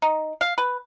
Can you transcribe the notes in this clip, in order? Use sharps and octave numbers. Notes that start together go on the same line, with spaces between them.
D#4
F5
B4